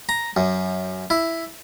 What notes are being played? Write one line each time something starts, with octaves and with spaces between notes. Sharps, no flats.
A#5
F#2
E4